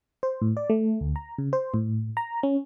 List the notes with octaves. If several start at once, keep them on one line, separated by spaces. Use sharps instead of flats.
C5
A2
D5
A3
D2
A#5
C#3
C5
A2
A#5
C#4